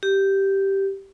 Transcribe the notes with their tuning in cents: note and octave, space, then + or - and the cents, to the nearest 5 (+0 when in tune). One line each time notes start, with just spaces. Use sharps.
G4 -5